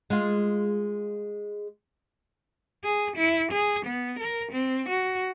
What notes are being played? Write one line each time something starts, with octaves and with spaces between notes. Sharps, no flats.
G#3 F4
G#4
E4
G#4
B3
A#4
C4
F#4